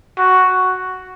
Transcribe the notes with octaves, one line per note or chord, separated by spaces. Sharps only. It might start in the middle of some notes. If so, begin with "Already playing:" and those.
F#4